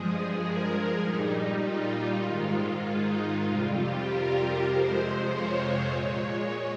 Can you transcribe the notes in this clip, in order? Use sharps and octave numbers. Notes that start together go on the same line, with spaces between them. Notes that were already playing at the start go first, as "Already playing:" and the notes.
Already playing: G2 F3 G#3 G#4
A#4
A#2 G3 D#4
F4
G#2 D#3 G#3
D#4
F2 C3 G3 F4
G4
A#4
F2 C3 F3 G#3 C5
C#5
A#2 G#3